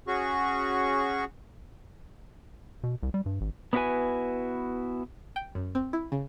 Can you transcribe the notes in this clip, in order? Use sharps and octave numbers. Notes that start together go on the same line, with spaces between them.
C#4 F#4 G#4 C#6
B2
C2
G3
G2
G#1
B3 C#4 E4 F#4 B4 G#5
G5
F#2
C4
E4
C#3